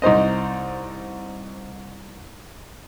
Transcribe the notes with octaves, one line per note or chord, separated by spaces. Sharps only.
C2 D#4 C5 D#5